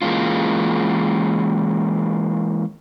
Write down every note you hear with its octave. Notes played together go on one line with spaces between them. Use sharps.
E3 G#3 A#3 C#4 F4